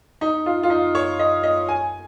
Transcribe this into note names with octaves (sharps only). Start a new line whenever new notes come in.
D#4
F4
F4
D#4
C#5
D#5
D#5
G#5